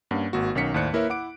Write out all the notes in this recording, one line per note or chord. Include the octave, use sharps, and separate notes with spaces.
G2 A#3 C#4 F#5
G#1 A#3 F#4
B1 D#3 C#4 F#5 B6 C#7
D#2 A2 C5 D5 F#6 C#7
A#3 E4 A#4 B4 C#5 E5
E4 F#5 D6 D7